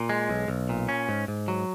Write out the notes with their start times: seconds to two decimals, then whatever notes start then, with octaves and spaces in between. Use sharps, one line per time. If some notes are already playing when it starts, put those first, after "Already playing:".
Already playing: A#2
0.09 G#3
0.29 B1
0.48 B1
0.69 A#2
0.89 C#4
1.09 G#2
1.28 G#2
1.48 F#3